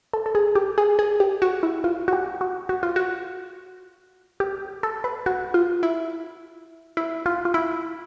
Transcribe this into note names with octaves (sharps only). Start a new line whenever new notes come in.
A4
A4
G#4
G4
G#4
G#4
G4
F#4
E4
F4
F#4
G4
F#4
F#4
F4
F#4
G4
A4
B4
F#4
F4
E4
E4
F4
F4
E4